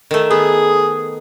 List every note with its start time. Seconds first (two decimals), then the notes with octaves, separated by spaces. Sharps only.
0.11 D#3 A3
0.31 B3 G#4